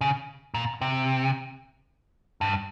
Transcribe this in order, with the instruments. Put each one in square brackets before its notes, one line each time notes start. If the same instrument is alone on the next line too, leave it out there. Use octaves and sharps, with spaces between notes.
[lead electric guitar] C#3
A#2
C3
G2